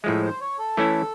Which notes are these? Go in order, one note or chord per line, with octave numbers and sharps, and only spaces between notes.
A2 F3 G#3 E5
C5
C#5
A4
E3 A3 C#4 E4